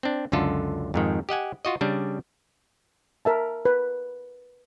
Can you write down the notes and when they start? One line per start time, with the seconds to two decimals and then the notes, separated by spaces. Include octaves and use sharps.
0.03 C4 D4
0.32 C#2 F#2 D3 F4 A4
0.94 F2 G#2 D#3
1.29 G4 D#5 F#5 G#5
1.65 F4 F#4 D#5
1.81 C#3 G3 D4
3.25 A#4 E5 A5
3.65 B4